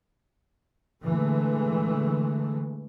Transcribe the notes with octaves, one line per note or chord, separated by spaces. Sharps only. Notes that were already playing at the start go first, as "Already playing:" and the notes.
A#2 D3 E3 G#3 A3